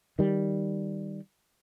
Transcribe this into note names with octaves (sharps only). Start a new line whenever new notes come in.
D#3 G3